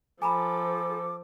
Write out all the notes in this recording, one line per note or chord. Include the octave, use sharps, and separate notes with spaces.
F3 A4 G#5 A#5 B5 D6